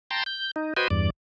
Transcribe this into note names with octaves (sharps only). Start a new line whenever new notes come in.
G5 A5 A#5 C6
G6
D#4
F#4 B4 C5 D#5 G5 G#5
E2 G2 D5